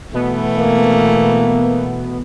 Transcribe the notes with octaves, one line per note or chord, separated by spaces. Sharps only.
B2 E3 A3 B3
A#3